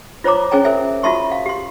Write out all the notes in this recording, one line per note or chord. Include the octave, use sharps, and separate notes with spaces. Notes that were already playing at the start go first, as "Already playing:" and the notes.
F4 C5 C#5 A#5 D6
C#4 G#4 C#5 G#5 A#5
A#4 C5 E5 G#5
F4 F#4 E5 A5 C6 C#6
F5
G4 C6